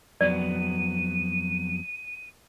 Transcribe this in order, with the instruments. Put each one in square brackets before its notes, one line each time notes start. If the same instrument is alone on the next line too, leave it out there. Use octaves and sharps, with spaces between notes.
[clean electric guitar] F2 F#3 B3 [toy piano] D5 [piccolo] D#7